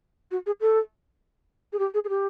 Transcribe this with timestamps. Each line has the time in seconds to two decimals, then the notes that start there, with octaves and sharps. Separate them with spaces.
0.31 F#4
0.46 G#4
0.61 A4
1.73 G#4
1.79 G4
1.94 G#4
2.04 G#4
2.09 G4